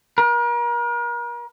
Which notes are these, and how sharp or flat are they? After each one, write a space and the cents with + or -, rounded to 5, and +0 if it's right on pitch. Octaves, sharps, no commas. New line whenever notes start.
A#4 +40